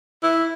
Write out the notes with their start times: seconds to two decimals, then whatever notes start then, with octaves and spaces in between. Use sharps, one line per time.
0.23 E4